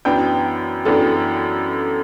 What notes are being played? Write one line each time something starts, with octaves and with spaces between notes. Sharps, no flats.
F#2 E3 B3 D4 G5
F#2 E3 B3 D4 A4